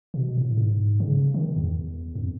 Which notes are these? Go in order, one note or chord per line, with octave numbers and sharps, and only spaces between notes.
B2
A2
G#2
C#3
D#3
E2
F2